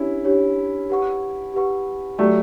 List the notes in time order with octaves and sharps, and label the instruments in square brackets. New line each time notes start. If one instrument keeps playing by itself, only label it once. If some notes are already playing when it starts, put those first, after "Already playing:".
Already playing: [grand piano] C#4 E4 [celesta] D4 G4 C#5
[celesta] D4 G4 C#5
G4 B4 F#5 C#6
G4 B4 F#5 C#6
[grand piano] F#3 A3 [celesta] G4 D5 G5 C#6